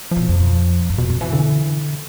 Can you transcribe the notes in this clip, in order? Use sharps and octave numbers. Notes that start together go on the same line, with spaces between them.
B2 F3
F2
G2
F2 B2
C3
E3
D3